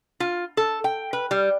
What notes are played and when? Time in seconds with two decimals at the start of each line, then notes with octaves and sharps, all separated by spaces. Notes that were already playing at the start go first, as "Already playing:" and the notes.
0.20 F4
0.57 A4
0.84 G5
1.13 B4
1.31 G3